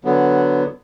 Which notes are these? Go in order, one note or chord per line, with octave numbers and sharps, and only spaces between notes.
D3 F#3 B3